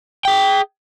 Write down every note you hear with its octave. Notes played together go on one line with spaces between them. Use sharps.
G#4 G5